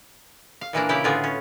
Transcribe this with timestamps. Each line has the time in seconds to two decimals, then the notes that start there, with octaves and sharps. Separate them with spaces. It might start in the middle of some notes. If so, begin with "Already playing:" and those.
0.61 F5
0.73 A#2 E3 A#3 D4
0.89 C#3 E4 G4 D5 G5
1.04 A2 D3 B3 F4 G#4
1.24 C#4